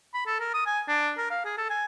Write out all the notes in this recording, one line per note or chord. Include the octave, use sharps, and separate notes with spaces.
B5
A4
A#4
D#6
G#5
D4
A#4
F5
G#4
A4
G#5